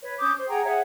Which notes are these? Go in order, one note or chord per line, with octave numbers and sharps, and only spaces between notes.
B4 C#5
C#4 D6 D#6 G6
C5
G#4 F#5 G5 A#5
G#4 C#5 E5 F#5